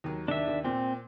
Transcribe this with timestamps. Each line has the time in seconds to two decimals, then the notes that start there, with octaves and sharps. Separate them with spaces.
0.04 D#2 F#3
0.28 D#2 D4 E5
0.47 D#2
0.64 A#2 C4